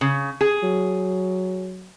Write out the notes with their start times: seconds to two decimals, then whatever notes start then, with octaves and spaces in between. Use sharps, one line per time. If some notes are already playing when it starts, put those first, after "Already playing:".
0.01 C#3
0.41 G#4
0.63 F#3